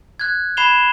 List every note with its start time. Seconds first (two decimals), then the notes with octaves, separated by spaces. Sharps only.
0.20 F#6 G#6
0.57 B5 G#6 C7 E7 F7 G7